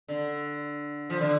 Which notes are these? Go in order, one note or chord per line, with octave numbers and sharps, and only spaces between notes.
D3
F3
D3